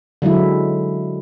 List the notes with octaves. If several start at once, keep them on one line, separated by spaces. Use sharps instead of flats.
D3 F#3 G#3 E4